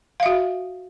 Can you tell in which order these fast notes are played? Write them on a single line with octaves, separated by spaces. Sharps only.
F5 E5 F#4